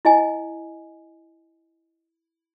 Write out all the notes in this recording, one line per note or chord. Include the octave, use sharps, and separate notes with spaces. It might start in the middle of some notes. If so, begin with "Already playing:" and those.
E4 D#5 G#5